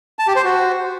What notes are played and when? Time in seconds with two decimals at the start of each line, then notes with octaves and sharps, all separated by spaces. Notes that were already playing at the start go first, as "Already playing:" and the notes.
0.19 A5
0.27 G4
0.36 C5
0.44 F#4